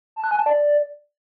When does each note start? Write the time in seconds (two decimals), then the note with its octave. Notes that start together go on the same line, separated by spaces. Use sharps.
0.16 A5
0.24 F#6
0.31 G#5
0.39 A5
0.46 D5